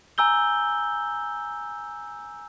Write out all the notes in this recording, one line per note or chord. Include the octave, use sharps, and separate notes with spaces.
G#5 A#5 E6 G6 G7